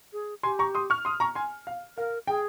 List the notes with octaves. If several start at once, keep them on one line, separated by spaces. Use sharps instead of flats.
G#4
G4 G#5 C6
A#5 C#6
C6 D#6
C#6 F6
C6 D#6
A#5 C#6
G#5 C6
F5
A#4 F5
G#4 G5